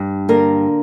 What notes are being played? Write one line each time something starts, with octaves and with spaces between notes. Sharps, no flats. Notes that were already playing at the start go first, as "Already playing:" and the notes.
Already playing: G2
D3 A#3 A#4